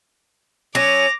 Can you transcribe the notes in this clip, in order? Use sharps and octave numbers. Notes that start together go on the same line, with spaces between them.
F#3 C#4 D6 A#6 F7